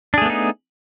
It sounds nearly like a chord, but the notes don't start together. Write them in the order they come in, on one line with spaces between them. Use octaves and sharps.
D4 G#4 A3 B3 D#4